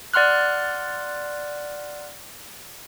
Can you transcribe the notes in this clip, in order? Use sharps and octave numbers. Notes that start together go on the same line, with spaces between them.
D5 F#5 C6 F6 F#6